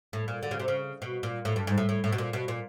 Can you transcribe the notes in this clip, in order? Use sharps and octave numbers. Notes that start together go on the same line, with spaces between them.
A2
A#2
D3
C#3
C3
C#3
B2
A#2
A2
G2
G#2
A2
A2
A2
B2
A#2
B2
A#2